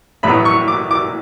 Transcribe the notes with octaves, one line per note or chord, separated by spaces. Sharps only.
A1 A2 F#3 B3 B5
C#6
D6
D6